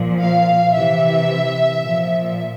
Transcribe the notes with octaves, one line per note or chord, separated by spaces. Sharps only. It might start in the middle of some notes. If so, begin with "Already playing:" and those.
Already playing: A#2 F3
F5
C3 E3 E5
A#2 F3